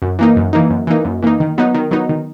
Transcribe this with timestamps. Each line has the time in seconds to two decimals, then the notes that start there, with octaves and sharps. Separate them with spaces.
0.02 F#2
0.19 E3 A#3 D#4
0.36 F#2
0.53 E3 A#3 D#4
0.70 F#2
0.87 E3 A#3 D#4
1.05 F#2
1.23 E3 A#3 D#4
1.40 D#3
1.58 F#3 B3 D#4
1.74 D#3
1.91 F#3 B3 D#4
2.09 D#3